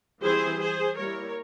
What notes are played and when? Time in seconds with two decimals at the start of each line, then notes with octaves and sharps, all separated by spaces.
0.22 E3 G3 C4 E4 G#4 C5
0.60 G#4 C5
0.97 G3 A#3 E4 A#4 C#5